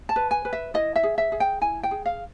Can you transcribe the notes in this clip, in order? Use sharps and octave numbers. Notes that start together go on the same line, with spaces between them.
A5
B4
G#5
B4
E5
E4 D#5
E5
G#4
E5
G#4
G5
E4 G#5
G5
G#4
F5